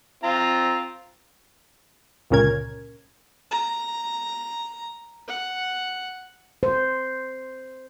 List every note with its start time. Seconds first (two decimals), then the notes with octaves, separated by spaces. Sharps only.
0.24 C4 F4 A#5
2.30 G1 C#2 A#2 C#4 A#4 G#6
3.51 A#5
5.28 F#5
6.63 C5